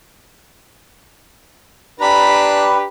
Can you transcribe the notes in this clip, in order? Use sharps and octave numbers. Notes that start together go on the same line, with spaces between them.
D4 G4 B4 A#5 B5